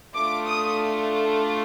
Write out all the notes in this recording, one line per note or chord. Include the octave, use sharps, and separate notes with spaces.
A3 D4 F4 D6
D#6